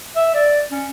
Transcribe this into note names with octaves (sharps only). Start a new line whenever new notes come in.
E5
D5
C#4